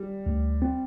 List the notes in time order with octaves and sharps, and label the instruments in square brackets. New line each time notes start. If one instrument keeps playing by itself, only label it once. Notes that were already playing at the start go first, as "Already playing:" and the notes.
Already playing: [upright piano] G3
[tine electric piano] D2
C4